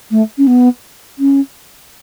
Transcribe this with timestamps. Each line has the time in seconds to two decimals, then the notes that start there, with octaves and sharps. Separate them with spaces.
0.11 A3
0.38 C#4
0.47 B3
1.19 C#4